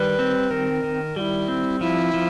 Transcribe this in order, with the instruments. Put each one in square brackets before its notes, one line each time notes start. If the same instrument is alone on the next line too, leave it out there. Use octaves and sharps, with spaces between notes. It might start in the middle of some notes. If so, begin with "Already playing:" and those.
Already playing: [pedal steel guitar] D#3 G3 [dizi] B4
[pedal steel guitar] C4
[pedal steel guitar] D#3 [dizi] A#4
[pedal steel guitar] D#3
[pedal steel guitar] G3 [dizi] F#4
[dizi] E4
[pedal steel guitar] C4
[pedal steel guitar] F3 [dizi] E4
[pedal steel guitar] F3